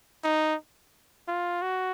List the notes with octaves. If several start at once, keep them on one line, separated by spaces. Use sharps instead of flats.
D#4
F4
F#4